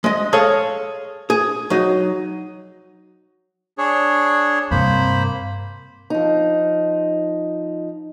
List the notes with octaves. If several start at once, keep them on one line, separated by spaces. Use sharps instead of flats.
G#3 D#5
G#4 A4 C#5 F5
G#4
F#3 D#4
D4 G#4 C#5
G2 C3 A#3 C5 B5
F3 D#4